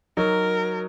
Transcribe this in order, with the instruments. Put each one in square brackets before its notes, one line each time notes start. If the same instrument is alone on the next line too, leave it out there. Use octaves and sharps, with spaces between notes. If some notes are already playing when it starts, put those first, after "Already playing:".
[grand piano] F#3 D#4 F#4 [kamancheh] A#4